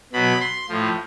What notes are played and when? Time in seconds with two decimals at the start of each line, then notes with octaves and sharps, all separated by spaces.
0.13 B2 F#3 B5
0.41 C6
0.69 A2 F3